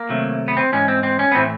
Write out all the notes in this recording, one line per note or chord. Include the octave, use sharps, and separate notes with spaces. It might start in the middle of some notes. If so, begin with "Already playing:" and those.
Already playing: A#3
C3 D#3 F#3 A3
B3
C4
G#2 E3 G#3 C#4
C4
C4
C#4
B3
A2 E3 A3 C4